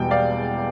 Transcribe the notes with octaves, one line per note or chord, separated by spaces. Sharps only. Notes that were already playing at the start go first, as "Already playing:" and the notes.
Already playing: E1 E2 B2 G3 G5
D5 F5